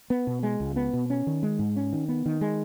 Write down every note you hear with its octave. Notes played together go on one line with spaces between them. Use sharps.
B3
B2
G#3
C#2
B3
B2
C#4
D#3
G#3
G#2
C#4
D#3
B3
D#3
G#3